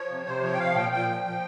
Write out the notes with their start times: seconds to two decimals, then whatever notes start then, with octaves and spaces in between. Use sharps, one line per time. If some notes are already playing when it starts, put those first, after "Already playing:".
Already playing: F3 C#5
0.10 C3
0.27 C3 C5
0.43 F3 C#5
0.54 G5
0.59 F3 F5
0.76 A#2 G5
0.92 A#2 G5
1.08 F3
1.25 F3